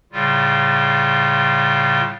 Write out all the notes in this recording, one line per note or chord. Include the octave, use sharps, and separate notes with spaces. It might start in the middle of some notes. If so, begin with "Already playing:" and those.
A2 C#3 G3 F4